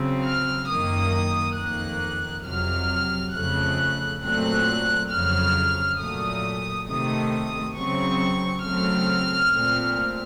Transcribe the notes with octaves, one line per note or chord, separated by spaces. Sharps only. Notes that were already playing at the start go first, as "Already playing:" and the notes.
Already playing: C#3 F#3 C4
F6
F#2 D#3 A#3 D#6
F2 D#3 A#3 F#6
F2 C3 F#3 F6
F2 C#3 A3 F#6
A#2 F#3 A3 C4 F#6
F2 C#3 F#3 F6
A#2 F#3 A3 D#6
C3 D#3 A3 D#6
C#3 F#3 C4 C#6
C#3 F#3 A3 C4 F6
A#2 A3 C4